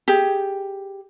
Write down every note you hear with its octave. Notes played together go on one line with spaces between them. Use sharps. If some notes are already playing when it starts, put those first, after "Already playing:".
G4 G#4